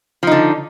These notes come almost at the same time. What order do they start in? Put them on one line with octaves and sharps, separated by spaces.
F3 D#4 D3